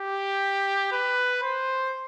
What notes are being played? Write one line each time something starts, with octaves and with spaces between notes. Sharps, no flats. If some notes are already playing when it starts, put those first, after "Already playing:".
Already playing: G4
B4
C5